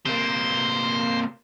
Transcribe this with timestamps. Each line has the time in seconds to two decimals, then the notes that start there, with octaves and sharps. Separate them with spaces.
0.06 C3 A#3 C5